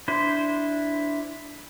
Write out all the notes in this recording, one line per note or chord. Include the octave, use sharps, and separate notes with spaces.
D4 E4 C5